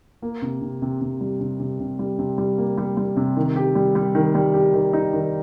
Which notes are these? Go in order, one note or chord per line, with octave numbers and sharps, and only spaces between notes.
A#3
C3
C3
C3
C3
G3
C3
C3
C3
G3
C3
G3
A#3
G3
G3
C3
D#3
G4
G3
G3
D#3
G3
G4
D#3
D#4
D#3